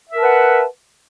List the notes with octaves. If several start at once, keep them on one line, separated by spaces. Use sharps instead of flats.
A#4 B4 E5 F#5 A5